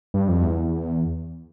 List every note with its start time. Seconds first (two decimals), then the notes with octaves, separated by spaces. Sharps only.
0.14 G2
0.29 F2
0.43 E2